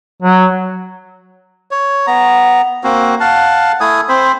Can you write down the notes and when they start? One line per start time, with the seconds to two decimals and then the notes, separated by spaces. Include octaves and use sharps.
0.22 F#3
1.71 C#5
2.07 B3 A#5
2.84 A#3 C4 F#4
3.20 F5 F#5 A5
3.80 A3 E4 G#5 D#6
4.09 C4 C5 B5